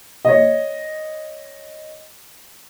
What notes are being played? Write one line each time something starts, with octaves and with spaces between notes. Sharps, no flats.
C#5 D#5